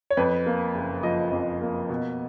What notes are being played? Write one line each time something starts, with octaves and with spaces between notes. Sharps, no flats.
C#5
F2 B4
A#3
F#1
F3 D#5
F2
A#3
B2